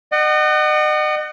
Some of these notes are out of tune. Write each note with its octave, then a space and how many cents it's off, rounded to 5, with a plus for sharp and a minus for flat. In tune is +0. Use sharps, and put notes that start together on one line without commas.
D#5 -35 F#5 +25